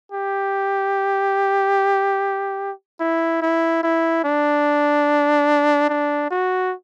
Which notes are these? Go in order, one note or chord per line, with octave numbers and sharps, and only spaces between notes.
G4
E4
E4
E4
D4
D4
F#4